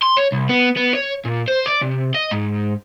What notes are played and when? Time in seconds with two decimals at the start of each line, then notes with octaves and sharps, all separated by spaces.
0.03 C6
0.17 C#5
0.32 C2
0.49 B3
0.77 B3
0.95 C#5
1.25 A#2
1.48 C5
1.66 D5
1.82 C3
2.15 D#5
2.31 G#2